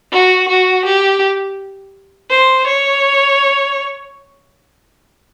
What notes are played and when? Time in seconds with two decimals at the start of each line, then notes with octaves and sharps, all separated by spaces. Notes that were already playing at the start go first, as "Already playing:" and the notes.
0.12 F#4
0.48 F#4
0.85 G4
2.30 C5
2.67 C#5